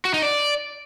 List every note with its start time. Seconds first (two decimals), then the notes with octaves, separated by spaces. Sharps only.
0.05 F#4
0.14 D#4
0.22 D5